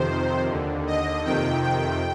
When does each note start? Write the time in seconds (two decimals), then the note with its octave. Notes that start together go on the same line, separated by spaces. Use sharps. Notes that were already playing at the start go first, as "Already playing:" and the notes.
Already playing: F2 C3 D#3 C5
0.50 D#2 D3
0.87 D#5
1.24 F2 C3 D#3 G5
1.62 G5